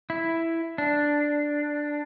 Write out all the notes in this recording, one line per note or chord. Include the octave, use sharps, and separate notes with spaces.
E4
D4